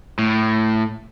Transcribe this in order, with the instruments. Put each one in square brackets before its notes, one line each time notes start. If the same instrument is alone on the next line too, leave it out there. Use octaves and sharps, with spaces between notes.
[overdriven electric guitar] A2